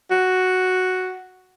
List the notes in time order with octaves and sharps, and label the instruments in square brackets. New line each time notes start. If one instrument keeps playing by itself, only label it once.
[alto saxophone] F#4